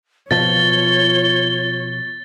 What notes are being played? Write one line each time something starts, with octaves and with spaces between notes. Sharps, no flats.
B2 F3 F4 C#5 A6 G7